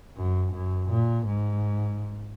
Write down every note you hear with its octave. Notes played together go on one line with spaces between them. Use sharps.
F#2
F#2
A#2
G#2